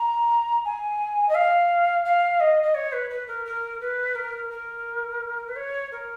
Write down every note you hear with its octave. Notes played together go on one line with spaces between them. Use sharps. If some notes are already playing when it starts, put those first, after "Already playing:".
Already playing: A#5
G#5
D#5
F5
F5
D#5
D#5
C#5
B4
B4
A#4
A#4
B4
A#4
A#4
B4
C#5
A#4